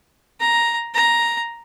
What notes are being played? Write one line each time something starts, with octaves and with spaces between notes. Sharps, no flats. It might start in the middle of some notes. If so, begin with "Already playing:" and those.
A#5
A#5